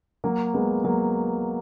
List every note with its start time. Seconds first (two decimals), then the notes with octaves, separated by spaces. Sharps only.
0.24 F#3 A#3
0.54 G#3 B3
0.84 F#3 A#3